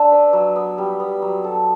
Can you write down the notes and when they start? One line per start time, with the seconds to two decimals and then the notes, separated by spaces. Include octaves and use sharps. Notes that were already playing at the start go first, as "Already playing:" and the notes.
Already playing: D4 D5 E5
0.12 B4
0.33 F#3
0.56 B3
0.78 G3
1.00 B3
1.22 F#3
1.44 A4